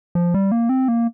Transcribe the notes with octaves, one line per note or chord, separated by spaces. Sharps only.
F3
G3
A#3
C4
A#3